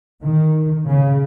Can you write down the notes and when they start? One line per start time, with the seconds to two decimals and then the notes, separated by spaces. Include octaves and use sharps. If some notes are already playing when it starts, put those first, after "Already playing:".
0.23 D#3
0.88 C#3